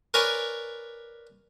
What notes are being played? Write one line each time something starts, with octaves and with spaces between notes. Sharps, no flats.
A#4 B4 C#5 D5 G#5